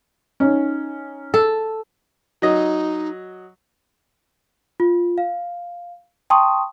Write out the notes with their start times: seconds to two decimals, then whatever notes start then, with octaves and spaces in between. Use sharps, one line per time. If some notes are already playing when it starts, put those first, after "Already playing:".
0.40 C#4 D#4
1.34 A4
2.42 F#3 D#4 D#5
4.80 F4
5.18 F5
6.30 G5 A5 C6 C#6 D#6